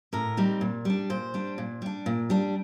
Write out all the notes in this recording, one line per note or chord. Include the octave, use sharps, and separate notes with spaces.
A2 A#4
G3 C4 D#4
A#2
G3 D4
A#2 C5
G3 D4
A#2
G3 D4
A#2
G3 D4